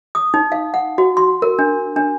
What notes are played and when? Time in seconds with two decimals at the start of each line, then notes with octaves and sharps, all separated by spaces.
0.15 D#6
0.34 D#4
0.52 F5
0.74 F#5
0.98 F#4
1.17 C6
1.42 A#4
1.59 D4
1.96 D4